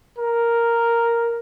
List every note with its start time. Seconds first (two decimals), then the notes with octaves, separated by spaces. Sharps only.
0.18 A#4